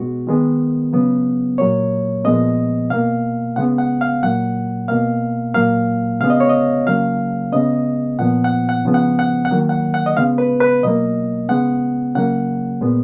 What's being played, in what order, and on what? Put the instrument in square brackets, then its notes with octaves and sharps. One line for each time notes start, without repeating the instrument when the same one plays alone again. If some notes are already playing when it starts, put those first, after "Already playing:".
Already playing: [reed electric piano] B2 G#3 B3 F#4
D#3 G#3 B3
C#3 F#3 B3
A#2 F#3 A#3 C#5
A#2 F3 G#3 B3 D#5
B2 A#3 F5
C#3 G#3 B3 F#5
F#5
F5
A#2 F#3 A#3 F#5
B2 A#3 F5
A#2 F#3 A#3 F5
C#3 G#3 B3 F5
D#5
C#5
D#5
C#3 F#3 A#3 F5
C#3 G#3 B3 D#5
A#2 F3 B3 F#5
F#5
F#5
C#3 F3 G#3 B3
F#5
F#5
F#5
D#3 F#3 A#3
F#5
F#5
D#5
C#3 G#3 B3 F5
B4
B4
B2 F#3 A#3 D#5
C#3 G#3 B3 F#5
C#3 F#3 A#3 F#5
A#2 G#3 B3